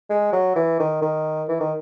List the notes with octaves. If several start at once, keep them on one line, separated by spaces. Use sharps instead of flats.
G#3
F#3
E3
D#3
D#3
E3
D#3